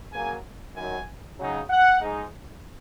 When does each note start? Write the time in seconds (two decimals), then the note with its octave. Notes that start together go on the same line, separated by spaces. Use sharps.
0.13 C#3 F#3 A#3 G#5
0.76 F#2 D#3 F#3 G#5
1.39 C#3 F#3 D#4
1.70 F#5
2.01 G#2 G#3 D#4